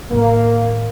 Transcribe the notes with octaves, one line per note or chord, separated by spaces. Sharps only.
A2 D#3 A#3